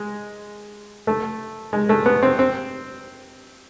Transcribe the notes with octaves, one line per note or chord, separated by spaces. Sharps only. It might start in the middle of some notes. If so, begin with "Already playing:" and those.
Already playing: G#3
A3
G#3
A3
B3
C4
C4